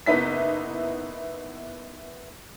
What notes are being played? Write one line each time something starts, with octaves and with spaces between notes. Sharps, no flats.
F#1 B3 D#4 E4 B6